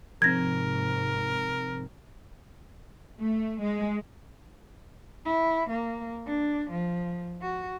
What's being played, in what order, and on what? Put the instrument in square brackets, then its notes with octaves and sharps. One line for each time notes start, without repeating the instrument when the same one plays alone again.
[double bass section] G#2 C3 [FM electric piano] F3 C4 [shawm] A#4 [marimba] G#6 A#6
[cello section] A3
G#3
[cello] E4
A#3
D4
F3
F#4